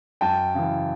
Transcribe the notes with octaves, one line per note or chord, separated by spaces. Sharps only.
F#2 G5 A5
C#3 E3